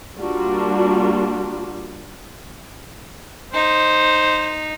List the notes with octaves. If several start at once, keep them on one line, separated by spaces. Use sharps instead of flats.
G3 A#3 D4 F4 F#4
D#4 C5